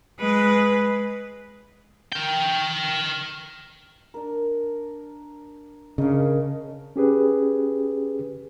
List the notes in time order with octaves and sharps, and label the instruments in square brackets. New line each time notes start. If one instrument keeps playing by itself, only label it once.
[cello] G#3 B4
[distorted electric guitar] A#4 G5
[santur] D4 A#4
[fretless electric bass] C#3 [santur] D4 A#4 D#5
[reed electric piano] C#4 G4 G#4 B4